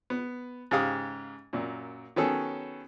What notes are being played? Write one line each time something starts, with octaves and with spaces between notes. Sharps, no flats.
B3
G#2 C#3 G4 F5 D#6
F#2 A#2
D#3 F#3 B3 C#4 G#4 A4